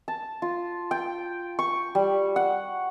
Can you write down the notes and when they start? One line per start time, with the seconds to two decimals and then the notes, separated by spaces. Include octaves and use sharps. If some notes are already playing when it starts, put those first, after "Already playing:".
0.08 A5
0.42 F4
0.91 G5
1.59 C#6
1.95 G3
2.36 F#5